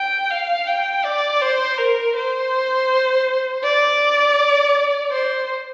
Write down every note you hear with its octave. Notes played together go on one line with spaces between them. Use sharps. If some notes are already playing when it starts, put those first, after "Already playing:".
Already playing: G5
F5
G5
D5
C5
A#4
C5
D5
C5